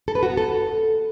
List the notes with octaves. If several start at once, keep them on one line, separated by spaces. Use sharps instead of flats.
A4
B4
F#4
B3
A4